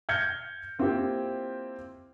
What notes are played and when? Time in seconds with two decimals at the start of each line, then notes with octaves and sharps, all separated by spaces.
0.09 F6 G6 G#6 A#6 C#7 G7
0.79 A#3 C4 E4 F4 G4 C5